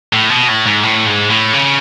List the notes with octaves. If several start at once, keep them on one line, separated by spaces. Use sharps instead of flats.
A2
B2
A2
G#2
A2
G#2
A2
C#3